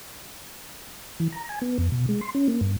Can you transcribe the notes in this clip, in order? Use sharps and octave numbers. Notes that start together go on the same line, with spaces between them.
E3
A#5
G#5
B3
F2
B2
G#3
C6
C#4
A#3
G2